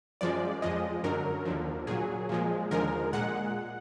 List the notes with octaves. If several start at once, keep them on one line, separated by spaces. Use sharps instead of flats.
F#2 F3 G#3 D5
F2 F3 G#3 D#5
F#2 D3 F#3 A#4
D#2 D3 F3
A#2 F#3 G#4
A#2 F3 G#3
D#2 D3 F3 G#3 A#4
A#2 G#3 F#5